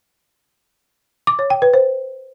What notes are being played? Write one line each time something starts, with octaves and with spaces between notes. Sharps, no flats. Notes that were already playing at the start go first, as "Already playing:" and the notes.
D6
C#5
G5
B4
C5